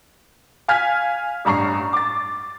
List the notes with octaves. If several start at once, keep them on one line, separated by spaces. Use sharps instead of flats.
F5 G#5 F6 G#6 B6
A1 G2 A#5 C#6 C7
D6 A6